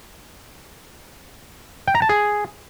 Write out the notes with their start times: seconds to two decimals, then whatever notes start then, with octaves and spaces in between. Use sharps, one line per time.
1.88 G5
1.95 A#5
2.02 A5
2.09 G#4